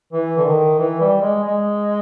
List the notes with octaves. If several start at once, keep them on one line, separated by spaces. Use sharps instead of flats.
E3
D3
D#3
E3
G3
G#3
G#3